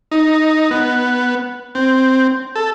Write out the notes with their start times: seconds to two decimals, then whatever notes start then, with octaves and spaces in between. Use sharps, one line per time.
0.11 D#4
0.71 B3
1.75 C4
2.56 A4